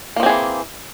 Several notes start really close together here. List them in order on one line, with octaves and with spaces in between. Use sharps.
A#3 F3 C4 G#4 E3